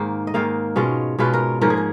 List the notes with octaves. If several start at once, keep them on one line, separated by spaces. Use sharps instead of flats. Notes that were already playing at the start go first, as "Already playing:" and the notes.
Already playing: G#2 D#3 A#3 F5
D#5
G#2 D#3 A#3 F5
B2 G#3 C#4 F4
B2 G#3 C#4 F4 B4
A#4
G#2 F3 A#3 C#4 A#4
G#4
A#4